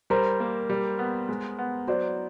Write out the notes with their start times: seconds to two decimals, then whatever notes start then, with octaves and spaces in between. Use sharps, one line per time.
0.10 G3 A#4 C5
0.40 A#3
0.70 G3
0.99 B3
1.29 G#3
1.59 B3
1.88 F#3 C5 D5